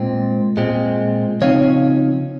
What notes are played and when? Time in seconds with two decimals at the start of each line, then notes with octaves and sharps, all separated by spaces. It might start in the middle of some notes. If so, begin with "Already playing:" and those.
Already playing: A#2 G#3 C4
0.57 A#2 G#3 C4
1.42 C#3 F3 C4 D#4 C#5 F5